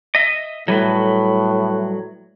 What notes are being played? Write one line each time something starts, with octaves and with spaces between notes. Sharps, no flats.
D#5 E5
A2 F#3 G3 B4